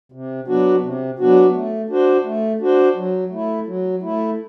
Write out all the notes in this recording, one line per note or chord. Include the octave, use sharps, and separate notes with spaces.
C3
F#3 B3 D4 F#4
C3
F#3 B3 D4 F#4
A3
D4 F#4 C5
A3
D4 F#4 C5
F#3
A3 E4
F#3
A3 E4